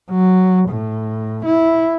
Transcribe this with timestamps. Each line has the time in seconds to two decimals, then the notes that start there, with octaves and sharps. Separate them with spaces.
0.11 F#3
0.69 A2
1.45 E4